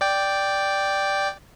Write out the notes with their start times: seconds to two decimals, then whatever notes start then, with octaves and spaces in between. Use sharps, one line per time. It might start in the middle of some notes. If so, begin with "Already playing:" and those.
0.01 D5 G5